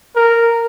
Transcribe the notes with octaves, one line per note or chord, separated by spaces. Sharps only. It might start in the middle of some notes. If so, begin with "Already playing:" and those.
A#4